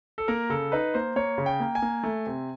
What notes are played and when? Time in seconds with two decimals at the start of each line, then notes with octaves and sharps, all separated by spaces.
0.18 A4
0.28 A#3 A#4
0.50 C#3 A4
0.72 D#4 B4
0.94 A#3 C5
1.16 A#3 C#5
1.38 C#3
1.46 G5
1.60 A#3
1.75 G#5
1.82 A#3
2.03 A3
2.26 C3